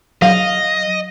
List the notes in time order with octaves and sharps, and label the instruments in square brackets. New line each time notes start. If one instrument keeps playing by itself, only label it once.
[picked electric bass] F#3 [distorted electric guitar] D#5 [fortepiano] F5